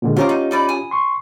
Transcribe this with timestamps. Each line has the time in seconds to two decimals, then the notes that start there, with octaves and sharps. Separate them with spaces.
0.02 A#2 D3 G#3
0.16 C#4 F4 G4 C5 A#5 D6
0.29 D#4
0.51 D#4 D5 B5
0.69 G#5 D#6
0.91 C6 C#6